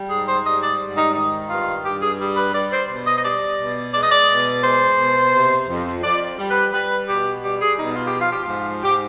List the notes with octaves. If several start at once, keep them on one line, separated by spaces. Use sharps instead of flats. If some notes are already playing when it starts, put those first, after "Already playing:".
Already playing: G3
G#2 G#4
C5
G3 D#5
D5
G#2
D#4
D#3 D#4
G2 F4
G2 G4
G#4
G3
B4
G3 D5
C5
B2
D#5
D#5
G3 D5
B2
G#3 D5
D#5
D5
B2
G#3 C5
B2
C3
F2
F2 D5
G3
B4
G3 B4
B2 G4
G3 G4
G#4
B2 D#4
F4
G4
F3
F4
G4
G#2 F4
G#2 G4